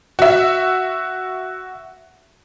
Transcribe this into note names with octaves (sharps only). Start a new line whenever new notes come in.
F#4 E5